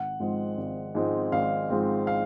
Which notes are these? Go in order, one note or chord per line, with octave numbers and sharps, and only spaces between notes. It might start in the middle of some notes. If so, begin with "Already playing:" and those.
Already playing: G#1 F#5
G#2 F3 G#3 C4
G#1
G#2 F3 G#3 C4
G#1 F5
G#2 F3 G#3 C4
F5